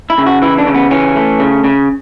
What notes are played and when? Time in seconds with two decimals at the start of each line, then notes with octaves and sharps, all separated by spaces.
0.10 E4
0.18 C#3
0.26 F#4
0.42 E3 E4
0.58 D4
0.67 C#3
0.75 B3
0.91 E3 C#4
1.16 A3
1.40 C#3
1.64 C#3